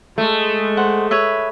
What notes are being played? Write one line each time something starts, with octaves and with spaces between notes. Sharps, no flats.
G#3 A3
C5 F#5
B4 C#5 E5